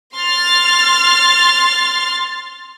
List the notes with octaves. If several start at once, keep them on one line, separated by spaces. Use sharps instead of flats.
C6 F6 A6